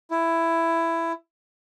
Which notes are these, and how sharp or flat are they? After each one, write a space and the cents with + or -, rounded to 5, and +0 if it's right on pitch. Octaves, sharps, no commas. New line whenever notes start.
E4 +10